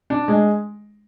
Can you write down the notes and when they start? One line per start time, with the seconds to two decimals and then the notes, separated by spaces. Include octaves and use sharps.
0.10 D4
0.28 G#3